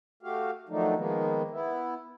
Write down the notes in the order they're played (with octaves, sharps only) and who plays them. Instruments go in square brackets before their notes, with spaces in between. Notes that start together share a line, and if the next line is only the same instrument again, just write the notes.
[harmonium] A3 F#4 G4 F5
D#3 F3 F#3 A3 D4 D#4
D#3 F3 G#3 A#3 B3
B3 E4